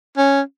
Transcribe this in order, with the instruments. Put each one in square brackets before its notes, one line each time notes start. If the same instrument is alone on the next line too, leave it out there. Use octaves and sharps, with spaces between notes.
[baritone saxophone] C#4